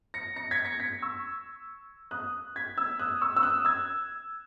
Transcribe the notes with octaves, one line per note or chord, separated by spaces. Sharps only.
A#6 C#7
A#6 C#7
G#6 B6
A#6 C#7
G#6 B6
C#6 E6
D#6 F#6
G#6 B6
E6 G#6
D#6 F#6
C#6 E6
E6
D#6 F#6
E6 G#6